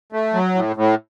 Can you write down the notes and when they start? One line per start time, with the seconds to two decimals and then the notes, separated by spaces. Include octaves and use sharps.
0.12 A3
0.34 F#3
0.55 A2
0.76 A2